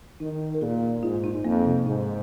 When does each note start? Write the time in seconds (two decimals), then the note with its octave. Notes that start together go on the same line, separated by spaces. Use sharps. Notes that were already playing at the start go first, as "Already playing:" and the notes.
0.20 D#3 D#4
0.54 A#4
0.61 A#2 G#4
1.03 G#2 F4
1.24 D#4
1.45 F2 A#3
1.65 C3
1.86 G#2 C3